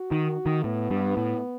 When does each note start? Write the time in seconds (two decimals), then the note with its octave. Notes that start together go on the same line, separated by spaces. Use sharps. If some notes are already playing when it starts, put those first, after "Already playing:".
Already playing: F#4
0.11 D#3
0.46 D#3
0.64 A2 B3
0.90 G2
1.17 A2